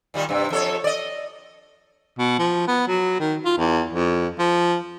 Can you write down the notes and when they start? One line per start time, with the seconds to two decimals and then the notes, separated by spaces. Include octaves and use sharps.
0.14 A#2 D#3 G3
0.29 G2 C3
0.50 F2 A4 C#5
0.84 D5 D#5
2.18 B2
2.39 F3
2.67 B3
2.88 F#3
3.20 D#3
3.45 F4
3.57 E2
3.93 F2
4.39 F3